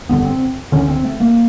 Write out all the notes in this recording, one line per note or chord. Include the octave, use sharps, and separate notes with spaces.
G1 G2 D3 B3
C4
E1 D2 D3 C#4
C4
A3
A#3